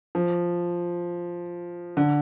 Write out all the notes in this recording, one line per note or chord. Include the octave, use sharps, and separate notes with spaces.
F3
D3